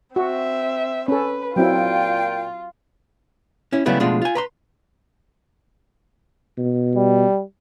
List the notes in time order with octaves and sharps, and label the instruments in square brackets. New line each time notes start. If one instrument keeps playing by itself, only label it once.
[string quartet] C4 E5 [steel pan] F#4
[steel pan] C#4 A4 [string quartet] B4
[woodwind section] A#2 G5 [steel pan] F#3 C4 E4 [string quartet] F4
[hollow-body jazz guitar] C#4 E4
C#3 F#3 G3 A3 B3 E4
B2 F3 G#3 A3 D4 F4
F4 G#5
B4 A#5 C6
[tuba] B2
[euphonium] G3